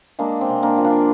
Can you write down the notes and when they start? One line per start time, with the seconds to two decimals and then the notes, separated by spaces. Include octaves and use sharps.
0.19 G#3 A#3 D4
0.41 C4
0.49 C3
0.63 A#3 D4
0.78 F3
0.84 D4 F4